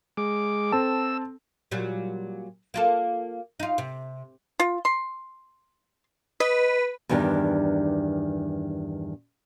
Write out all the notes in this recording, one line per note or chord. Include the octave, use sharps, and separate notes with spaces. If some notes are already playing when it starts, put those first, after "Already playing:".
G#3 D6
C4 A4 A5 E6
A#2 F#3 G3
A#3 F4 A4
D#4 F4
C3
F4
C6
B4 D#5
E2 G2 D#3 G3 D4